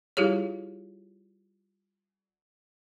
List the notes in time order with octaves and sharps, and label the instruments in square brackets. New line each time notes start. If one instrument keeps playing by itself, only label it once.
[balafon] G3 E4 F4 G4 G#4 C#5